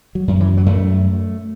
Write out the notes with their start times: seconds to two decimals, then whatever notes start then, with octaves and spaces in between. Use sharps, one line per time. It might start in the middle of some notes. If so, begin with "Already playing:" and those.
0.15 F#3
0.28 F#2
0.40 E3
0.57 F#3
0.66 F#2 A3